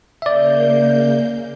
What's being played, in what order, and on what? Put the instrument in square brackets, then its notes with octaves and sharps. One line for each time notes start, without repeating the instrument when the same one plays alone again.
[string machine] C#3 A#3 G6 [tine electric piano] D5 E5